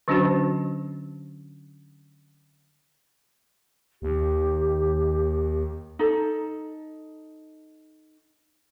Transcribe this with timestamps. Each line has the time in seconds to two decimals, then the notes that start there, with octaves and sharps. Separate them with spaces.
0.08 D3 F#3 C#4 D4 F#4 C5
4.02 D#2 G4
5.99 D#4 A4